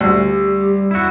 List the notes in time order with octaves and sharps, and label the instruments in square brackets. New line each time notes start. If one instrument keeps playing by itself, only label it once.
[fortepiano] D2 [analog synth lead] G3 [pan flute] G4
[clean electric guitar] E4 F#4